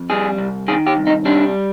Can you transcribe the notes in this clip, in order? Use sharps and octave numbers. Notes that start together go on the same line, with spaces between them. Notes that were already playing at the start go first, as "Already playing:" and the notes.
Already playing: F2
G3 G#4
C2
D#3 G#4
G4
C2
D#4
G3 D4